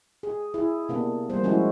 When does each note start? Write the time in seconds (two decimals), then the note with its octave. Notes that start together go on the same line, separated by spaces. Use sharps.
0.23 G#4
0.54 E4 G#4
0.89 C3 A#3 B3 D4
1.29 G3 A#3 C5
1.43 F3 G#3 C#4 E4 F#4